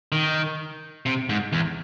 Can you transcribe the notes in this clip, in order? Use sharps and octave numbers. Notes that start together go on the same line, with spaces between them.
D#3
C3
G#2
E2